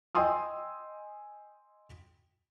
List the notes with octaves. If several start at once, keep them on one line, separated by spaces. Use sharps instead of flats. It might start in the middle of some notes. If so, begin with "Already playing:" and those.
D#5 G5 G#5 C6 D#6 E6